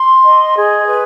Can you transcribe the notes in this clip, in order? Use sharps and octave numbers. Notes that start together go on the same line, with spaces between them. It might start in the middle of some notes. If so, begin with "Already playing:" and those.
Already playing: C6
D#5
G#4
B4